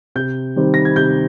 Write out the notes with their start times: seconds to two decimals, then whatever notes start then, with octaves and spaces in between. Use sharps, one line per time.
0.15 C3 G6
0.56 D#3 G3 C4
0.74 A#6
0.85 G#6
0.96 C3 G6